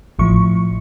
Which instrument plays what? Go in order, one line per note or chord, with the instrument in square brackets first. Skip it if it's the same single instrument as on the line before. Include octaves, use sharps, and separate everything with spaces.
[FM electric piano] A1 A2 F3 C#6